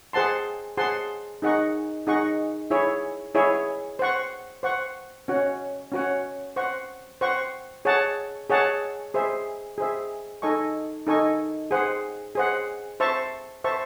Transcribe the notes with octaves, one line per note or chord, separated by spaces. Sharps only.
G#4 C5 F#5 A5 C6
G#4 C5 F#5 A5 C6
D#4 G#4 D#5 F#5 C#6
D#4 G#4 D#5 F#5 C#6
E4 G#4 C#5 E5
E4 G#4 C#5 E5
C5 F#5 C#6
C5 F#5 C#6
C#4 F#4 C#5 F#5
C#4 F#4 C#5 F#5
C5 F#5 C#6
C5 F#5 C#6
G#4 C#5 F#5 A5
G#4 C#5 F#5 A5
G#4 C5 E5
G#4 C5 E5
D#4 A4 D#5 G#5 C#6
D#4 A4 D#5 G#5 C#6
G#4 C5 F#5
G#4 C5 F#5
C5 E5 A5 C#6
C5 E5 A5 C#6